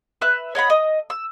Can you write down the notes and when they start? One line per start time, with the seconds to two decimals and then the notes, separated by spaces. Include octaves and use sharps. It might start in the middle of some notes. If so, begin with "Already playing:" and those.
0.21 B4 E5 E6 F#6
0.55 C#5 D#5 F#5 B5
0.70 D#5
1.10 E6